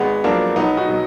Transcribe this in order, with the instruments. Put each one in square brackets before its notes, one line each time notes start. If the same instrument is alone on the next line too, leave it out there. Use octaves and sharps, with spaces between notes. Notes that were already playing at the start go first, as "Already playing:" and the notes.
Already playing: [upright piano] G#1 G#3 B3
F#2 F3 A#3 D4
B1 B3 D#4
D#4 F#4
B2 F#3